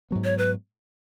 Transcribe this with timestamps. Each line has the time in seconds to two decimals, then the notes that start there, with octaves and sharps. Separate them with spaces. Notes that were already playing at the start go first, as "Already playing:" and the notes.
0.11 G#2 F#3 B3
0.24 C#5
0.38 B4